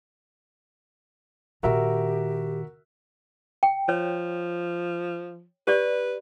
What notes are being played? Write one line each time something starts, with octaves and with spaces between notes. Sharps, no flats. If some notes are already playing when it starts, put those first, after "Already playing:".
A#2 D#3 F#4 G4 A#4 E5
G5
F3 C#5
G4 B4 D5